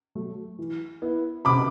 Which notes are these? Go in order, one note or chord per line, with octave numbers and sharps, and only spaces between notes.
F#3 A3
E3
B3 E4
C3 B5 D6